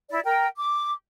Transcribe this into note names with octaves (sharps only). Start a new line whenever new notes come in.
E4 D5
A#4 G5
D6